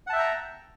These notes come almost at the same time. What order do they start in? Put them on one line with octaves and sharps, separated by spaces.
F#5 A5 E5 G5 A#5